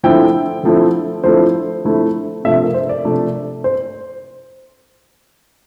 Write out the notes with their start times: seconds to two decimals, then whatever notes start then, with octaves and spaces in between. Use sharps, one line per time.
0.03 D3 F3 A3 C4 E4 G5
0.63 D3 F3 A3 C4 E4
1.24 D3 F3 A3 C4 E4 C5
1.84 D3 F3 A3 C4 E4
2.44 C3 F3 A3 D4 E5
2.63 A#4
2.74 C5
2.89 D5
3.04 C3 F3 A3 D4
3.64 C5